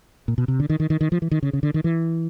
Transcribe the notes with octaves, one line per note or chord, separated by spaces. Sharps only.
A#2
B2
C3
D3
D#3
D#3
D#3
D#3
F3
E3
D#3
C#3
C#3
D3
D#3
E3